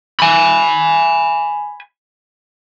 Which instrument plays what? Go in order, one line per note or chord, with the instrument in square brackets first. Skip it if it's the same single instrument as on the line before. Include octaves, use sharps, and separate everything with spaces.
[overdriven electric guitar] G#5 B5